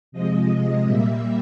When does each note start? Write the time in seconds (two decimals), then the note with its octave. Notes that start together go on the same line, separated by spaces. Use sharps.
0.12 C3 F3 G#3 D#5
0.86 A#2 G3 A#3 E5